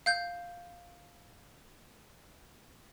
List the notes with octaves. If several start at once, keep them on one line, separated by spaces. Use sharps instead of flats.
F5 G6